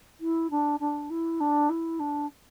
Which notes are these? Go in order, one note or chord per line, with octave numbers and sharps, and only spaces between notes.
E4
D4
D4
E4
D4
E4
D4